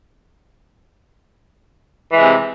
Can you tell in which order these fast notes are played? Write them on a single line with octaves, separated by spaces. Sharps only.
E3 G#3 C3